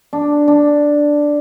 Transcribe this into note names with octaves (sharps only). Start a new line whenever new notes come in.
D4
D4